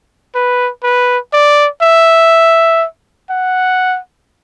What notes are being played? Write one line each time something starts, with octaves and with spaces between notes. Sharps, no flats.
B4
B4
D5
E5
F#5